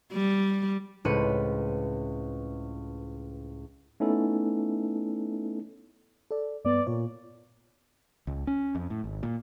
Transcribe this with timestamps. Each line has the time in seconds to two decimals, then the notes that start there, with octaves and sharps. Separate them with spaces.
0.13 G3
1.05 C#2 A2 C4 B4 C#7 D#7
4.00 A3 B3 C#4 D#4 E4 A4
6.31 A4 D5
6.65 G2 B3 D5
6.87 A#2 C#5
8.27 C#2
8.47 C#4
8.75 F2
8.90 A2
9.04 G#1
9.23 A#2